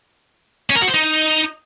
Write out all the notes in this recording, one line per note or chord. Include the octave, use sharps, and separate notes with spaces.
C#4
A#4
F#4
C5
D#4